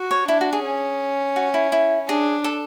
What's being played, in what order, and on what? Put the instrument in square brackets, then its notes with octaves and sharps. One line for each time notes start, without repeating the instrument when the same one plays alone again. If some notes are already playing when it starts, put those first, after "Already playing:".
Already playing: [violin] F#4
[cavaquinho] C#5
[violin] D4 [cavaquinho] E4
[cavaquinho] F#4
G#4
[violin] C#4
[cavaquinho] F#4
E4
E4
[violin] D4 [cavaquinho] G#4
[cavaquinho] A4